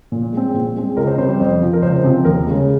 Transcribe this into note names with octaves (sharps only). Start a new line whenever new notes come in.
A#2
G#3 C4
A#2
G#3 C4
C#2 A#4
C5
C3 G3 C5
C5
F2
C3 F3
A#4
C#2 C5
C3 F3 C4
D#2 A#4
C#3 G#3